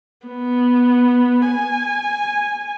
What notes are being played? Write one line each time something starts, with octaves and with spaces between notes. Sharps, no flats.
B3
G#5